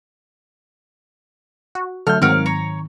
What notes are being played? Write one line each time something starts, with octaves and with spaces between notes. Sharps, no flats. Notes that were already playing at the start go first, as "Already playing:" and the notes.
F#4
D3 F#3 A3 A4 F6 G6
G#2 D#3 F#3 C4 A#4 C#5 F5
C#5 A#5